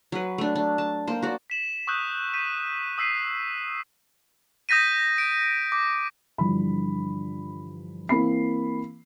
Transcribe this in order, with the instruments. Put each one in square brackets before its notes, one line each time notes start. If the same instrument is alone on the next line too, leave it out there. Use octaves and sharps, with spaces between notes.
[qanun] F#3 B4
A3 D4
D4
A5
A#3 C5
F#4 D5
[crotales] B6 E7 F#7
C#6 D#6 E6 F#6 G6
G6 B6 D#7
D#6 E6 B6 C7 D#7
D#6 G6 A#6 B6 D#7
D7
D6
[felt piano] G2 D3 E3 F3 G3 B5
E3 A#3 C4 B5 C7